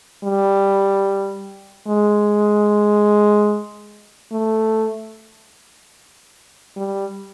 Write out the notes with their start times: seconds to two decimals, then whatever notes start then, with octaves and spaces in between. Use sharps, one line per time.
0.24 G3
1.88 G#3
4.32 A3
6.77 G3